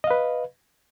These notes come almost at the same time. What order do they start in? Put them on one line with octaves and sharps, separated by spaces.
D#5 F5 B4